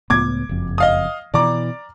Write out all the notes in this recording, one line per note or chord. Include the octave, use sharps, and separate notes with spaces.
C#2 A2 B3 D6 G#6
F#1 F2
D#5 F5 D#6
B2 E3 D5 A#5 D6